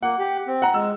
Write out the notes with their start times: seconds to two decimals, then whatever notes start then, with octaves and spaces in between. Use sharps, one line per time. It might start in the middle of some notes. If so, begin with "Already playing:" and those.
0.03 A#3 F#5
0.19 G4
0.47 C4
0.62 F#5 A#5
0.74 G#3 E6